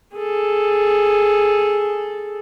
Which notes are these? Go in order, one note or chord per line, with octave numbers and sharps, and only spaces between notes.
G#4 A4